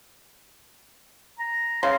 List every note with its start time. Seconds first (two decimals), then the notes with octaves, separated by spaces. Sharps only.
1.39 A#5
1.83 C#3 C6